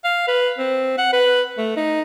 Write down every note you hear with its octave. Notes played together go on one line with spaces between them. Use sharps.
F5
B4
C4
F#5
B4
A3
D#4